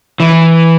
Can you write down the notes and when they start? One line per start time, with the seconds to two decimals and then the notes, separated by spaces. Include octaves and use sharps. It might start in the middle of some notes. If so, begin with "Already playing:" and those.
0.20 E3